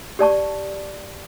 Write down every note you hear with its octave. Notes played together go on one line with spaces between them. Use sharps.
G4 D5 A5 C#6